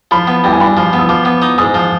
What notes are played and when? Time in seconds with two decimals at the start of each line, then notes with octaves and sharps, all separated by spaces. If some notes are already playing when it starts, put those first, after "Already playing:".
0.11 F3 B5
0.27 B3
0.44 G2 G5
0.53 G#5
0.60 G2 B5
0.77 F3
0.93 B3
0.99 D#6
1.09 F3 D6
1.25 B3
1.42 D#4
1.58 G#2 D#6
1.74 F3